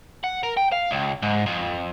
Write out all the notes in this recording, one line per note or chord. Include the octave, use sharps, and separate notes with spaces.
F#5
A#4
G5
F5
C#2
G#2
F2